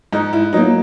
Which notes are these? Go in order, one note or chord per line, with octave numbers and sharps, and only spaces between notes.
G#2 D#4
E4
F#3 A#3 D#4